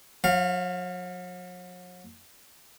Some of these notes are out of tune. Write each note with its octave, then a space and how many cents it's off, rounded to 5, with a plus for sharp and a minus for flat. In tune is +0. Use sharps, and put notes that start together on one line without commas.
F#3 -40 F5 +0